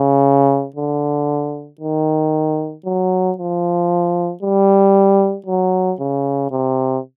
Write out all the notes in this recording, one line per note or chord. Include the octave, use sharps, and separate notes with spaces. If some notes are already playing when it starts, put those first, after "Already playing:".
Already playing: C#3
D3
D#3
F#3
F3
G3
F#3
C#3
C3